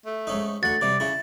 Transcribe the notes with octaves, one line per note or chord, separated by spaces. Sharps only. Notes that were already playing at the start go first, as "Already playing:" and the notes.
A3
G#2 C#4 D#4
D2 F#4 F#5 A6
C3 G3 D5
C#3 E4